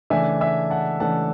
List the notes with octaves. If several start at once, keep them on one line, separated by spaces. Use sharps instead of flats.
C#3 E3 A3 D4 E5 G#5
E5 G#5
F#5 A5
C#3 E3 A3 D4 F#5 A5